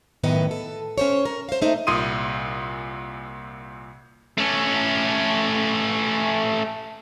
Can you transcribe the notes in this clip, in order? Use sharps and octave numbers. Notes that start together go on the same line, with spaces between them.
F#2 A2 D#3 B3 B4 D#5
A4
C#4 C5 C#5
A#4
C5 F5
A3 A#3 D#4 C5
C2 A#2 C6 D#6 D#7
A3 C#4